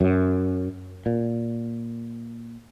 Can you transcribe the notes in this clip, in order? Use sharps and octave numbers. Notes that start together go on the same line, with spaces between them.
F#2
A#2